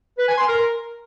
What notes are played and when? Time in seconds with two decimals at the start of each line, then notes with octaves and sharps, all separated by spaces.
0.19 B4
0.28 G#5
0.38 C6
0.48 A#4